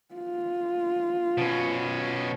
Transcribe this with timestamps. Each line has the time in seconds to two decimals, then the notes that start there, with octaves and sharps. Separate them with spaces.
0.15 F4
1.38 B2 C#4